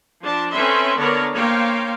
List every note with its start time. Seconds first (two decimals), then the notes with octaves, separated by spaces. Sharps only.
0.22 F3 D4 A5
0.53 C4 C#4 A4 B4 E5 C6
0.97 D3 B3 D4 A#4 C#5
1.35 A#3 C5 C#5 F5 G5